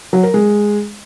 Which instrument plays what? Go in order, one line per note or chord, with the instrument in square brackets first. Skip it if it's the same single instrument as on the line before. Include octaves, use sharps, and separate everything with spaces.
[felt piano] F#3
A#4
G#3